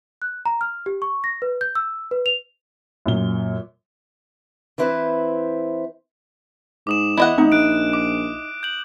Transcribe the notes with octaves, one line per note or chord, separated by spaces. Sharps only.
F#6
A#5
F6
G4
C#6
A#6
B4
G6
E6
B4
F7
F#2 A#2 G7
E3 C4 E4 B4 C5
G#2 D6 D#6 E7
E2 E4 D#5 F#5
A1 D#4
A#1 F#6 D7
D6
G6 F#7